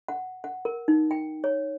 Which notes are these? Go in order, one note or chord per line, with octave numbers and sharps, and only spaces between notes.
F#5
F#5
A#4
D#4
G5
C#5